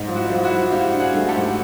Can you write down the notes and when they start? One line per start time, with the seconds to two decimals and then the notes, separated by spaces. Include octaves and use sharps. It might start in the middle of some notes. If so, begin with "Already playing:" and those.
Already playing: G#2
0.08 F3
0.15 E4 F#4
0.30 F3
0.43 E4 F#4
0.52 F3
0.72 G#2 F4 G4
0.93 D4
1.00 F#4 G#4
1.14 A3
1.29 G4 A4
1.35 G#2